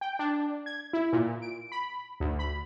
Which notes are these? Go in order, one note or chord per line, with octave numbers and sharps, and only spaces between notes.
G5
D4
G#6
E4
A#2
D7
B5
D2
B5